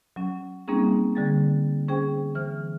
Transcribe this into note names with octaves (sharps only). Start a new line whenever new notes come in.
F#3 C#4
G3 A#3 C4 C#4 D#4 G#4
D3 G3 G#4 A6
C#4 G#4 C5 G5
E3 C5 F6